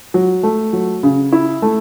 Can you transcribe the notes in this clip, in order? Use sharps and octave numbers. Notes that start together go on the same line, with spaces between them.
F#3
A3
F#3
C#3
E4
A3